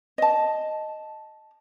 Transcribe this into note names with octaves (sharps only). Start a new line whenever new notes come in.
D#5 A5